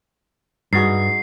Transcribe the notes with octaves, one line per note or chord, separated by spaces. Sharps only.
G2 D#4 F#4 G#4 C7